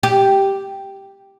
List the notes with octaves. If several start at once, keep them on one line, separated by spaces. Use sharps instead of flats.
G4